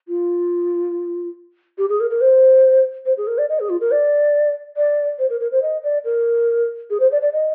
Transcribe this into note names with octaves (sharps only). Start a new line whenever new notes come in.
F4
G4
G#4
A#4
A#4
C5
C5
G#4
A#4
D5
D#5
G#4
F4
A#4
D5
D5
C5
A#4
A#4
C5
D#5
D5
A#4
G#4
C5
D5
D5
D#5